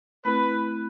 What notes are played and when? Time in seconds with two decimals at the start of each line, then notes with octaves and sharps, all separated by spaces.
0.25 A3 C4 E4 B4